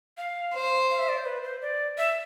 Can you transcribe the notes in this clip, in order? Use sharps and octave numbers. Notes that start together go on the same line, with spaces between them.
F5
C5
F5
E5
D5
C5
B4
C5
D5
E5